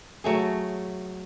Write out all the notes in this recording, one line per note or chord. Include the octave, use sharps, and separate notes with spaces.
F#3 A3 G#4